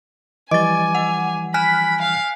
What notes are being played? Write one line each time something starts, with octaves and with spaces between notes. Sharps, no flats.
E3 F3 G3 D#5 G#5 D6 A6
F#5
G#5 B5 F6 F#6 B6
F5